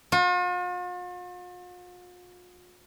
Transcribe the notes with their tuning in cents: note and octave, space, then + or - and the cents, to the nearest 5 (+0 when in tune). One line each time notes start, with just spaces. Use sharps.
F4 +45